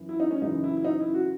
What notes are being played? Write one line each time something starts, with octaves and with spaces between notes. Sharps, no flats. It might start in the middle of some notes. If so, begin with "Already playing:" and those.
Already playing: F#2 E3
E4
D#4
C#4
F#2 C#3 E3 D#4
E4
E4
D#4
E4
F#4